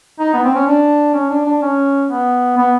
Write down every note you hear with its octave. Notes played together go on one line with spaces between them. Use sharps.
D#4
B3
C4
C#4
D4
C#4
D4
D4
C#4
B3
B3